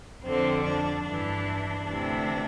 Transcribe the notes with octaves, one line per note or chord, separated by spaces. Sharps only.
F2 D3 C4
D4
G2 E3 D4
D2 C3 E3